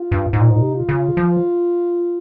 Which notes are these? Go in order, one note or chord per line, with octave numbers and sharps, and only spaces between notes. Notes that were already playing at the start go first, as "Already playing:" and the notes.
Already playing: F4
G2
G#2 D#4
A#2
G#2
A#2
C3
F4
C#3
F3